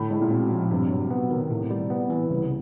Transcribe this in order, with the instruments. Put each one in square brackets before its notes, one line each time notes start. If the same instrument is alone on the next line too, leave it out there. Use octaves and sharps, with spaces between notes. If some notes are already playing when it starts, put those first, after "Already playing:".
Already playing: [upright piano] A2 [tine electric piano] D3
[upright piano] A2 [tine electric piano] G#3
[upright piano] A#2
[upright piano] B2 [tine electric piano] C4
[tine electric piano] F3
[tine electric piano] G2 [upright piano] C3
[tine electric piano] F#3
[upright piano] B2 [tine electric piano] B3
[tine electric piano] D#3
[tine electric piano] A2 [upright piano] C3
[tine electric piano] G3
[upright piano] C3 [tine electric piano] B3
[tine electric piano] E3
[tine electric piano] C2 [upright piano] C#3